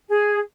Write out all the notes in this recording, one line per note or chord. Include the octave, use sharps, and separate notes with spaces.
G#4